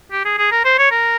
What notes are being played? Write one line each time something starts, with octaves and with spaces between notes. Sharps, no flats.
G4
G#4
G#4
A#4
C5
C#5
A#4